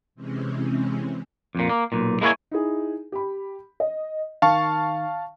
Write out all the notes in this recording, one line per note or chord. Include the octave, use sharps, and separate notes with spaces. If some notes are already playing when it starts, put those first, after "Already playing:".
C3 E3 G#3 C4 C#4
F2 A#2
A#3
B1 A#2
G#3 A#3 E4 A#4 C#5 G#5
D#4 E4 G#4
G4 B5
D#5
D#3 F5 A5 C#6